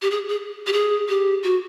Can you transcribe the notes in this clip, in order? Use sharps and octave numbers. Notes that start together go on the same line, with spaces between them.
G4
G#4
G#4
G4
G#4
G4
F#4